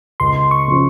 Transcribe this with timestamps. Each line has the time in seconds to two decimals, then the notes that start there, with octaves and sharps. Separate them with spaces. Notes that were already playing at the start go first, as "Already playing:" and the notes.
0.20 C#2 C6
0.51 C#6
0.68 C#3 F3